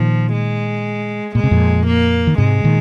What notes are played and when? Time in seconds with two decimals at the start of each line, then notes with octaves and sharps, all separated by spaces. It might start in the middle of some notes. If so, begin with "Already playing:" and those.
Already playing: A#2 D#3 F3
0.32 G#3
1.35 A#2 G#3
1.44 C3
1.51 F2 A#2
1.87 A#3
2.27 D#3
2.38 G#2 C3 G#3
2.64 A#2 D#3